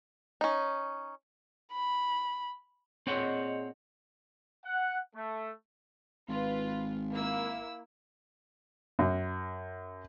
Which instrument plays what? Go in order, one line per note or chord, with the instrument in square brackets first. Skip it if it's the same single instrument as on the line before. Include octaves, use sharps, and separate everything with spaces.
[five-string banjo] C#4 D#4
[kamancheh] B5
[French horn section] A#2 G#4 D#5 [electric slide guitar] C4 C#5 F#5
[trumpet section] F#5
A3
[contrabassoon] G#1 [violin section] F4 B4
[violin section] A#3 E4 E6
[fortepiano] F#2